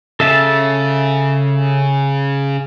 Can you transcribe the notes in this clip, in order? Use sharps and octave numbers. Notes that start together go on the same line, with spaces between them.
C#3 A4 E5 A5